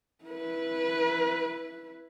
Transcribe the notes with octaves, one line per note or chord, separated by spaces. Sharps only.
E4 B4